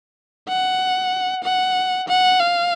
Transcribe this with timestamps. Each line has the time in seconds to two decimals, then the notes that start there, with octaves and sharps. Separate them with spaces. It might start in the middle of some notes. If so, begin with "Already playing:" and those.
0.48 F#5
1.44 F#5
2.08 F#5
2.40 F5